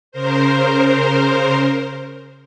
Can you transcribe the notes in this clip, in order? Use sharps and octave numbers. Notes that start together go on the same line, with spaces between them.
C#3 A#4 C5